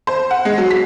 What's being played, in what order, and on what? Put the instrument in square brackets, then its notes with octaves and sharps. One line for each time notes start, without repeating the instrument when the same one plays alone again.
[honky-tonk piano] C5
F#5
G#3
F#3
B6